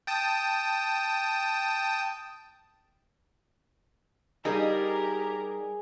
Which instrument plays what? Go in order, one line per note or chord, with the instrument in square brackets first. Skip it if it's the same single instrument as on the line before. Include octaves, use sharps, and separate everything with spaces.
[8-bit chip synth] G5 A5 D#6
[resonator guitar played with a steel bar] G3 D#4 [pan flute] G4 [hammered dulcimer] G#4 [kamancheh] A#4